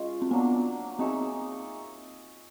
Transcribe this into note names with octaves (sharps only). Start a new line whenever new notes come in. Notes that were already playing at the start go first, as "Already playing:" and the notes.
Already playing: G#3 C#4 F4
C4
F#3 A#3 B3 D4
C4 D#4 G#4 C#5 E5